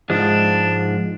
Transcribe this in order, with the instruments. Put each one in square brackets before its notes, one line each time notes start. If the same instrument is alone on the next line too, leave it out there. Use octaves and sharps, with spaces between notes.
[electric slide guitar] G#2 F3 G#3 [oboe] D4